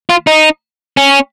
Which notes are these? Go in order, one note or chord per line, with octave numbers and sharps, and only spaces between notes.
F4
D#4
C#4